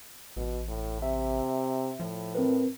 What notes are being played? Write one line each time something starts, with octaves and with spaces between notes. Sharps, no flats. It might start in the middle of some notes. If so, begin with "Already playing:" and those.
A1 B2
A2
C3 E5
A2 F3
C4 A#4 B4